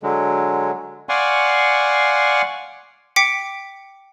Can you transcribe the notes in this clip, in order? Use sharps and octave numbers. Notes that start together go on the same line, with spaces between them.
D3 F#3 G#3
D5 F5 F#5 G#5 C6 C#6
G5 D6 B6 C#7